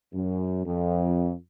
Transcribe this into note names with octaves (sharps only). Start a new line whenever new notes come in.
F#2
F2